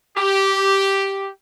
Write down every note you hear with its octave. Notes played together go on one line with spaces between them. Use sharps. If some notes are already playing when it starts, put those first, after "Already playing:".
G4